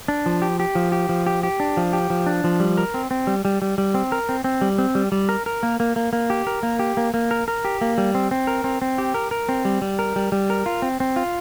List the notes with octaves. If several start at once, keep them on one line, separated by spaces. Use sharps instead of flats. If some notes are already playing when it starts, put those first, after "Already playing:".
D4
F3
G4
G4
F3
G4
F3
G4
G4
D4
F3
G4
F3
D4
F3
G3
A#4
C4
C4
G3
G3
G3
G3
C4
A#4
C4
C4
G3
C4
G3
G3
A#4
A#4
A#3
A#3
A#3
A#3
G4
A#4
A#3
G4
A#3
A#3
A#4
A#4
G4
A#3
G3
C4
C4
A#4
C4
C4
G4
A#4
A#4
C4
G3
G3
A#4
G3
G3
A#4
F4
C4
C4
F4